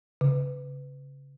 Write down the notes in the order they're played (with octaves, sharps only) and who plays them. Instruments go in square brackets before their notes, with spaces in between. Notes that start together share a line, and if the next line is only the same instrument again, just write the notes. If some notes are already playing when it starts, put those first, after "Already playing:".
[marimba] C#3